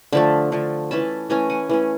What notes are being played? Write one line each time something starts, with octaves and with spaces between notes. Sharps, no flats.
D3 F3 A3 A5 B5
D3 F3 A3
E3 A3 C#4 A5 B5
E3 A3 C#4 G#5 A#5
F#5 G#5
E3 A3 C#4